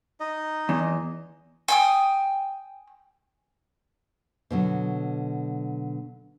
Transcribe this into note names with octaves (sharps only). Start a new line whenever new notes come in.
D#4 D#5
E2
G5 G#5 D#6
B2 D3 F#3